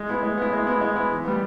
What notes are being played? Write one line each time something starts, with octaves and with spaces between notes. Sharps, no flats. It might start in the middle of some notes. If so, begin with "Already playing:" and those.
Already playing: G#3
B3 E4
G#3
B3 E4
G#3
B3 E4
G#3
B3 E4
E3
G3 B3